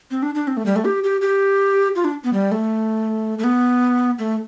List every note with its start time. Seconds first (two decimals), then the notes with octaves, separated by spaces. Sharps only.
0.11 C4
0.22 D4
0.35 D4
0.47 C4
0.57 A3
0.66 G3
0.76 A3
0.85 G4
1.04 G4
1.21 G4
1.95 F4
2.04 D4
2.24 B3
2.33 G3
2.51 A3
3.39 A3
3.44 B3
4.19 A3